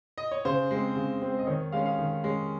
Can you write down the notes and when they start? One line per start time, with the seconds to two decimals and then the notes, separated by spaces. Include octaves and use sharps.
0.18 D#5
0.31 C#5
0.45 C#3 C5
0.71 G#3 C4
0.96 C#3
1.22 G#3 C4
1.39 D#5
1.47 D#3 C#5
1.72 G#3 C#4 F5
1.86 F5
1.99 D#3
2.24 G#3 C#4